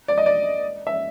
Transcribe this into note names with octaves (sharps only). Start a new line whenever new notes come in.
D5
D#5
D5
E5